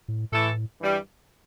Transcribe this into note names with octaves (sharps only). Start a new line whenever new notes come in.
A2
A2 E3 A3 E4 A4
G2 E3 G3